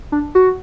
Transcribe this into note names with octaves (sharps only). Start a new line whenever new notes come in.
D4
F#4